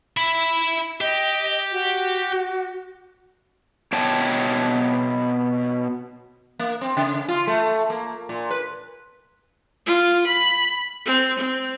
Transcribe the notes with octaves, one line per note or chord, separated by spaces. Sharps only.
E5 B5
G4 D#5
F#4
B2 C#5 G5 A5
A#3
C4
C#3
F4
A3
A#3
A#2
B4
F4
B5
C4
C4